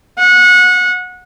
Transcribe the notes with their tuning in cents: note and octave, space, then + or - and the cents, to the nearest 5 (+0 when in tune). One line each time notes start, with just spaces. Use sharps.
F#5 -25